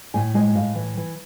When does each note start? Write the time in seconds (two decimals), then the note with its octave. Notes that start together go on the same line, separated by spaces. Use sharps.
0.14 A2 G#5
0.34 G#3 G#5
0.55 A2 F5
0.75 E3
0.97 E3